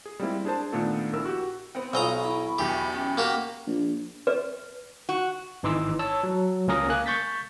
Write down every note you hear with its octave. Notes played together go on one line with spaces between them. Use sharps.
G#4
G3 G#3 A#3 C4 E4
D4 G#4 A#4 C5 A5
A#2 D#3 A3 B3 D4 A4
A#1 E4 A#4 E6
F#4 G4
B3 C4
B1 F4 C5 D#5 G#5 A#5 B5 C#6
E4 B5 C#6
B1 E2 G4
C#4 G5 B5
A#3 F#4 G4 A#4
A#1
B4
F#4
G#1 E3 D#4 C6 D6 E6
C#5 A5 E6
F#3
C#2 A#3 C#4 A#4 D#6 A#6
A#3 G#5 F#6
C#6 G6 A6 B6